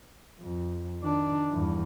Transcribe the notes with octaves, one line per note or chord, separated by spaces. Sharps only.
F2
D#3 D4
E2 G2